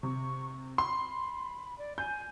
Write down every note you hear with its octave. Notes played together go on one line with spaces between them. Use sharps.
C3 C#6
B5 C6
D5
G#5 G6